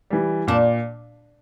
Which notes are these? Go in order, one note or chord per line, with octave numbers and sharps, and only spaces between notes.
E3 G3
A#2 D4